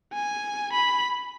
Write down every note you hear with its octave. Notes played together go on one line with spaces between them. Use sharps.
G#5
B5